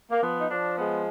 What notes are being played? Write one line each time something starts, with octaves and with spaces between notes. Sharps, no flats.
A#3
F3 B3
D#4
F3 D4
G#3 B3